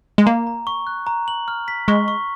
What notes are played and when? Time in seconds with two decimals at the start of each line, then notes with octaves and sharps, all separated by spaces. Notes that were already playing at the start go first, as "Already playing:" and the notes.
0.18 G#3
0.26 A#3 A#5
0.47 A#5
0.67 C#6
0.87 F#6
1.07 A#5
1.28 F#7
1.48 F6
1.68 B6
1.88 G#3 C#6
2.08 C#6